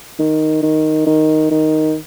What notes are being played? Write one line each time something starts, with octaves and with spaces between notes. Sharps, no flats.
D#3
D#3
D#3
D#3